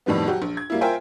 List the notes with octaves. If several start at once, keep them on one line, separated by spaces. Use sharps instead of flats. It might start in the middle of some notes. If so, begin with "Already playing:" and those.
F2 A2 D#3 G3 B3
F#3 F#4 G4
A#1
G#6
G3 A#3 E4
F4 A#4 C5 E5 G5 G#5